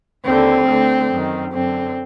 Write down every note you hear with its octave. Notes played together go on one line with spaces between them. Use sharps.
D#2 D3 C4
D2 D3
F#2 D#3
F#2 D3 C4